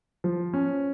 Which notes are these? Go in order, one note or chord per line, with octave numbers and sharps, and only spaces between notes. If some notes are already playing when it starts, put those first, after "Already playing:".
F3
C#4